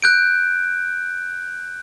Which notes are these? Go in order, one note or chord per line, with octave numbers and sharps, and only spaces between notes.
F#6 G6 D7